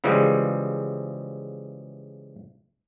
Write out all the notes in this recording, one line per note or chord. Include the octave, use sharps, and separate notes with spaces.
C#3 E3 F3 G3 G#3